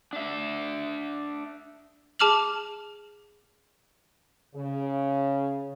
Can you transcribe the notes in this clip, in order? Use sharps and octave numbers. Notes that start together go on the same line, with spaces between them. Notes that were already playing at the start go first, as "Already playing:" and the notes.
D4 E5
G#4 A5 D6 F6 F7 F#7
C#3